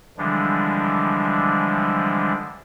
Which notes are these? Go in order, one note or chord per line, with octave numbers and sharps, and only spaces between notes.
D3 E3 F3 G3 G#3 D4